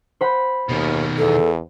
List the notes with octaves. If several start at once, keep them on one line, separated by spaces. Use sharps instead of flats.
C5 F#5 B5
D#2 B2 D#3
E2 A4